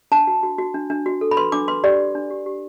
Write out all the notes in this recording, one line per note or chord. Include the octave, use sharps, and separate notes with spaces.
D4 A5
F#4
F#4
F#4
D4
D4
F#4
A4
B5
B4 C6
D4 D6
B4 C6
G4 D5
G4
D4
G4
G4